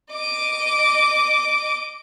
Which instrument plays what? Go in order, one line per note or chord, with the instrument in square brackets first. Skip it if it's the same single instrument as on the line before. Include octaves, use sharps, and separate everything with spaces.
[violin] D#5 D6